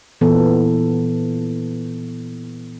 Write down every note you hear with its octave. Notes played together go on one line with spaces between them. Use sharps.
A#2 E3 B3 A4